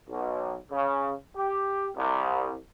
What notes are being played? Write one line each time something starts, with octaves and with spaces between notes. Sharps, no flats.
B1
C#3
G4
C2